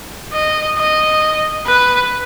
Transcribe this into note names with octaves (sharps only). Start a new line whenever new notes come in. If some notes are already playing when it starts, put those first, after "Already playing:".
D#5
D#5
B4